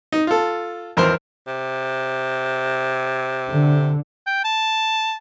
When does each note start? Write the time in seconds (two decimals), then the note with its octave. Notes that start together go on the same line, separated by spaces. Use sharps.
0.12 D#4
0.27 F4 A4
0.97 G#1 E2 A#4 C5 F6
1.47 C3
3.49 D3
4.27 G5
4.44 A5